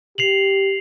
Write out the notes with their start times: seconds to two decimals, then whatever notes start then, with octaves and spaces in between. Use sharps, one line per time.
0.18 G4 C7 F7 F#7